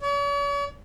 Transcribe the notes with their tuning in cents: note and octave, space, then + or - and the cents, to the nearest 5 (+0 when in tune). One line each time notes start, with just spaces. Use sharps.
C#5 +45